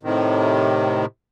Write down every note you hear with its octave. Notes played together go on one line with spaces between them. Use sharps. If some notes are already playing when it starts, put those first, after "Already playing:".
A2 C3 D#3